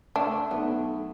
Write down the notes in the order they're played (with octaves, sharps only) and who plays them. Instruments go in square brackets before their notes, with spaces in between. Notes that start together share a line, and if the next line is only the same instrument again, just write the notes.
[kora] A3 [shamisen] D4
[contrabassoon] B1 [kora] B3